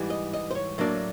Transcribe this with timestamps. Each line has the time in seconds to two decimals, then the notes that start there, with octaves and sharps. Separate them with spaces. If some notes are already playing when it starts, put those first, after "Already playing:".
Already playing: G#2 E3 G3
0.10 D#5
0.33 D#5
0.51 C5
0.55 C#5
0.78 A2 F#3 A#3 D4